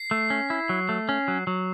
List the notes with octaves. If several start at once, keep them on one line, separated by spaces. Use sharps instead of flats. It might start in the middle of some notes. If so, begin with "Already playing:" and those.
Already playing: C7
A3
C#4
E4
F#3
A3
C#4
F#3
F#3